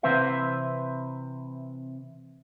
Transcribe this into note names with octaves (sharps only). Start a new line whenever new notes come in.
C3 E3 C4 B4 C5 E5